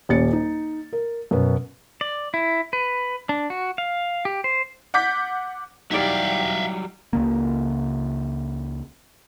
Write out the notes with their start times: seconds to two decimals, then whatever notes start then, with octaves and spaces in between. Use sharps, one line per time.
0.09 D#1 C#4 A6 C#7
0.33 D#4
0.93 A#4
1.31 F#2 B2 B3
2.01 D5
2.34 E4
2.73 B4
3.29 D4
3.50 F#4
3.78 F5
4.25 G4
4.44 C5
4.94 F#5 D6 G6 B6
5.91 F#3 G3 D#4 E4 G4 D5 E5 F5
7.13 C#2 C#3 A#3